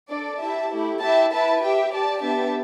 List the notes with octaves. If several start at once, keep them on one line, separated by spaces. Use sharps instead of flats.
D4 A4 D5
E4 G4 E5 A5
A3 E4 G4
E4 G4 E5 A5
E4 B4 E5 A5
G4 E5 G5
G4 D5 A5
B3 D4 G4 E5 A5